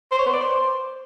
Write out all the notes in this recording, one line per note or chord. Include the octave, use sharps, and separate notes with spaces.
C5
C#5
B3
D5
C5